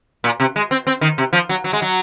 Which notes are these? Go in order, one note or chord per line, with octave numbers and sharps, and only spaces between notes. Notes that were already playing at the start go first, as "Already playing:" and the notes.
A#2
C3
G#3
C4
C4
D#3
C3
F3
F#3
F#3
G#3
F#3